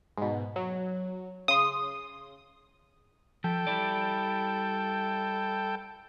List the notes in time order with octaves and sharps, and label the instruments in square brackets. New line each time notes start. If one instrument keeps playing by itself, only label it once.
[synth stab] G#2 B2
F#3
[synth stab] C#3 C6 [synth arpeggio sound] D#6
[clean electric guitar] F3 [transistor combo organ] A4 G5
[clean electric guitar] G3 E4 D5